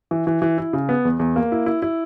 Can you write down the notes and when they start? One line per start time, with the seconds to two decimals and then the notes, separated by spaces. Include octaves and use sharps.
0.11 E3
0.27 E3
0.42 E3
0.58 E4
0.73 C#3
0.89 B3
1.05 E2
1.20 E2
1.36 A#3
1.52 E4
1.66 E4
1.82 E4